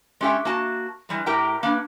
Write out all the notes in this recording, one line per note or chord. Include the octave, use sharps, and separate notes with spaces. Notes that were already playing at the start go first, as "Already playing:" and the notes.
G#3 C#4 G4 A4 E5 G5
A#3 F#4 A5
E3 G3 G#3
A2 G4 A#4 G5 A#5
A#3 B3 D4